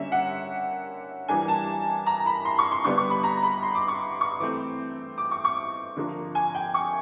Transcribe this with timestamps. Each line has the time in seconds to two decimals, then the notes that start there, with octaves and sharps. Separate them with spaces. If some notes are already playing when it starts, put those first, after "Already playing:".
Already playing: D3 G3 A#3 C#4 E5
0.12 F#5
1.28 E3 G3 A#3 D4 G#5
1.48 A5
2.06 A#5
2.26 B5
2.45 C6
2.59 C#6
2.72 C6
2.84 D3 G3 B3 D4 C#6
2.98 C#6
3.10 B5
3.24 A#5
3.43 B5
3.63 C6
3.75 D6
3.88 C#6
4.21 C#6
4.40 E3 A3 C4 D6
5.18 D6
5.31 C#6
5.45 C#6
5.96 D3 F3 A#3 D4
6.35 G#5
6.55 G5
6.74 C#6